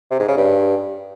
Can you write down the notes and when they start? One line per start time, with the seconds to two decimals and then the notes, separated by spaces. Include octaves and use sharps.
0.11 C3
0.19 G#2
0.28 C#3
0.37 G2